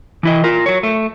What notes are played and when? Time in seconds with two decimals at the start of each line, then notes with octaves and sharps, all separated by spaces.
0.23 E3 E4 D#5
0.44 F4 A#4
0.66 F#3 C#5
0.83 A3